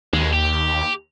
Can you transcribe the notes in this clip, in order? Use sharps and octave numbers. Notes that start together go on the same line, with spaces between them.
D#2 B2 G#3
G4